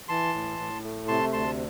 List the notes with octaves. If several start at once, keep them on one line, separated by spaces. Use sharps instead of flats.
E3 A5 C6
A2
A2
A3
C3 A5 C6
D2 A5 C6